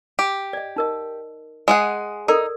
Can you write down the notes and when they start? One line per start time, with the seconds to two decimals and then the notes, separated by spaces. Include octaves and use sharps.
0.19 G4
0.53 D5 D#5
0.76 D#4 A#4 D#5
1.68 G#3 G#4 F#5
2.28 D#4 A4 A#4 D5